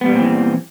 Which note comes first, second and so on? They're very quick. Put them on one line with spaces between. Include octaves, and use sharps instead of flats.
B3 G3 A#2 C4 E3